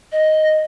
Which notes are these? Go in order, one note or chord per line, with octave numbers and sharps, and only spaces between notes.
D#5